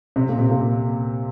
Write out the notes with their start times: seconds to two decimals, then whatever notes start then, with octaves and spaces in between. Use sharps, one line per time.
0.16 C3
0.29 A#2
0.39 C3
0.51 A#2